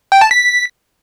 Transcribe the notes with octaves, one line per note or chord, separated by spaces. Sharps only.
G5
A5
B6